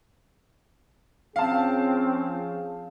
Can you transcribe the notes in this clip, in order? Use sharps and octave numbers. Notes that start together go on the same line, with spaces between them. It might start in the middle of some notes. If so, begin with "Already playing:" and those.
F3 C4 C#4 G#4 F5 A5